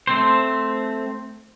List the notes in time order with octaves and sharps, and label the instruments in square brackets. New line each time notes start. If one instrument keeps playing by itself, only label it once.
[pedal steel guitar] A3 C4 C5